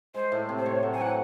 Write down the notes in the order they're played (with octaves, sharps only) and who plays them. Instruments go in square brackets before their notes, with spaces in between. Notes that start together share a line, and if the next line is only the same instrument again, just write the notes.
[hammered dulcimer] G#3 [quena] C5
[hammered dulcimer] A2 A3
C3 C4
[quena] C5
[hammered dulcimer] A2 A3 [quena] C#5
[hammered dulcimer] F#3
[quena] G#5
[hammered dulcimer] E3 [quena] F#5